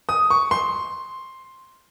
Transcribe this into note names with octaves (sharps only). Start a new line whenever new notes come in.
D#6
C#6
C6